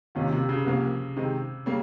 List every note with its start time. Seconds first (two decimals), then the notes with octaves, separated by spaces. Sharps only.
0.15 D#2 C3 D#3 A#3 C#4 F4
0.32 C3
0.49 C#3
0.65 C2 C3 F3 A#3
1.16 C3 D#3 G#3 C4
1.66 C#3 G3 A#3